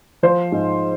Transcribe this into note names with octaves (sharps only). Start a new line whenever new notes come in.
F3 C5
G#2